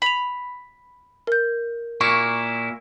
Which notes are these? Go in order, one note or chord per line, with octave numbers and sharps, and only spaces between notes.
B5 F7 F#7
A#4 G6
A#2 A#3 E4 C#6